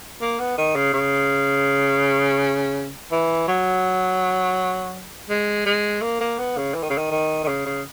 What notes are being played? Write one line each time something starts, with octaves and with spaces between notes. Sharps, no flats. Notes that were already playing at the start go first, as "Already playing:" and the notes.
A#3
B3
D#3
C#3
C#3
E3
F#3
G#3
G#3
A#3
A#3
B3
C#3
E3
D#3
C#3
D#3
D#3
D#3
C#3
C#3